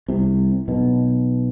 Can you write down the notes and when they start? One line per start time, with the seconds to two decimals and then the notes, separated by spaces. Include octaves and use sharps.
0.08 C2 C3
0.68 B1 B2